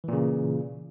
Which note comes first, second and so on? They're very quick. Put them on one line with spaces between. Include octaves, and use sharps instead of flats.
E3 A#2 C#3